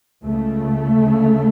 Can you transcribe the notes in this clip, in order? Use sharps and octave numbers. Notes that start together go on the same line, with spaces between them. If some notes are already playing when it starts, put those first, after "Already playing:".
C#2 C#3 A3
D2 C#3